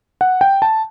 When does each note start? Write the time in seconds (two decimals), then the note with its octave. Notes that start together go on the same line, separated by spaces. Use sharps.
0.21 F#5
0.41 G5
0.62 A5